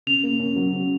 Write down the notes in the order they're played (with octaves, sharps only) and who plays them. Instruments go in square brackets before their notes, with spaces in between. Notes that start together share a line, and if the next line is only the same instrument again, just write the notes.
[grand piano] C#3 [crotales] F7
[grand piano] A#3
C#4
F#3
C#3